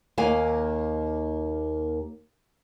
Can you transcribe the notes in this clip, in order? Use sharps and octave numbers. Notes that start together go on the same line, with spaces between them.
D#2 A#3 F5 G#5